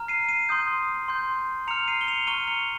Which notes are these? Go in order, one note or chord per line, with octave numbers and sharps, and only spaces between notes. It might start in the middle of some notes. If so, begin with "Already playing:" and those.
Already playing: A#5 F6
C7 D#7
C7 D#7
C6 D#6 G6
C6 G6
A#5 F6 C#7 F7
C7 D#7
G7
C#7 F7
A#5 C#6 F6 D#7 G7
C#7 F7